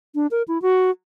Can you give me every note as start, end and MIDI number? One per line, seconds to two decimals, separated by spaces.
0.15 0.27 62
0.31 0.43 70
0.48 0.61 64
0.62 0.90 66